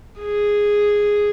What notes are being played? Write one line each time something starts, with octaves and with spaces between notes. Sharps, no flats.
G#4